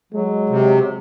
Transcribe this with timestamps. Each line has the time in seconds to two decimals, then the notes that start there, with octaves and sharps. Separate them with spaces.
0.13 F#3 G#3
0.50 C3